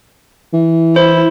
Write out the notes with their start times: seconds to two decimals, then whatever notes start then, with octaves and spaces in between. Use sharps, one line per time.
0.53 E3
0.96 E4 C5